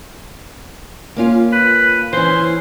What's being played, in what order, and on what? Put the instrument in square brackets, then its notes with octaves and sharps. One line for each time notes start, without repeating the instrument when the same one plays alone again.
[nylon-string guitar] A#3 C#4 F4
[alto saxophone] B4
[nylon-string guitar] E3 C#4 [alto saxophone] C5